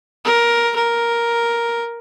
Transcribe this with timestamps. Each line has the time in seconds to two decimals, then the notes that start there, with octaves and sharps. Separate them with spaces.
0.25 A#4
0.76 A#4